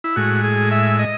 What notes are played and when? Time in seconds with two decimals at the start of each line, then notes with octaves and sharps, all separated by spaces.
0.04 E4
0.16 A2 G#3 F#4
0.44 G#4
0.71 E5
0.99 D#5